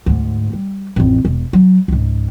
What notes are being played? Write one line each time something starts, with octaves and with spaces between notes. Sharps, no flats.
D2 G#2
G3
A1 F2
E1
F#3
C#2 G#2